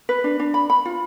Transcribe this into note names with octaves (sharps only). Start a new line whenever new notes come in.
B4
D4
D4
B5
B5
F4